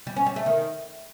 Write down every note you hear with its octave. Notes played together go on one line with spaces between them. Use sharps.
G3
C#4
G3
A3
D#3